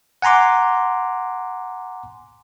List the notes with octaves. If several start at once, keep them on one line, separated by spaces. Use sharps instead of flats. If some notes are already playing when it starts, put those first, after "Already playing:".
F#5 G#5 A#5 C6 D6